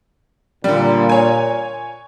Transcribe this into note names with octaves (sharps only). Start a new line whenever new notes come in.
A#2 D3 G3
C#5 G#5